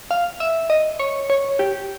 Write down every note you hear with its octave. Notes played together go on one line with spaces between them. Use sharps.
F5
E5
D#5
C#5
C#5
G4